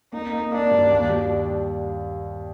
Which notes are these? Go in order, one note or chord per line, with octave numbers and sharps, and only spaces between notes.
A#3 D#4
A#3
A#3 D4
G2
D#2
G3